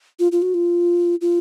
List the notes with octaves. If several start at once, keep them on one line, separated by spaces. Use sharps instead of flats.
F4
F4
F#4
F4
F4